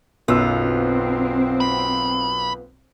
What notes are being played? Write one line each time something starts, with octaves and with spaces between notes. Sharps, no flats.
B1 F#2 B3 F4 E6
C4
B5